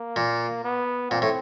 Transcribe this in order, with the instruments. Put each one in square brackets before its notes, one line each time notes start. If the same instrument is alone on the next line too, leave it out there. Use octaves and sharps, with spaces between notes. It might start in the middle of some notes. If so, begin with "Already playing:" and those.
Already playing: [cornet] A#3
[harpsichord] A#2
[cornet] B3
[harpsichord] A#2 [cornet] C4
[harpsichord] A2